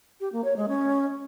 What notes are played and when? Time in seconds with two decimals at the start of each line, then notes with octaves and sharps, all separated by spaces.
0.21 G4
0.33 A#3
0.44 C#5
0.56 G#3
0.68 C#4